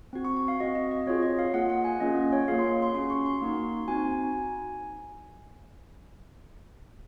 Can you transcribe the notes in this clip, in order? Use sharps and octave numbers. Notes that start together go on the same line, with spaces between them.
C4 F#4
C#6
C#6
F5
C4 F#4 D#5
D#5
D#5
C4 F4 G#4 C#5
D#5
F5
A#3 F4 G#4 F#5
F#5
G#5
A#3 C#4 F4 G#4 D#5
D#5
C#5
A#3 F4 G#4 F5
C6
C6
C#4 F#4 C6
C#6
C6
A#3 D#4 F#4
C4 D#4 F#4 G#5